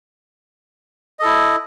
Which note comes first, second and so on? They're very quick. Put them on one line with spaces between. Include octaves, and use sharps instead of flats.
D#5 A4 E4